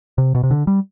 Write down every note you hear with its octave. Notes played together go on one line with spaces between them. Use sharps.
C3
B2
C3
D3
G3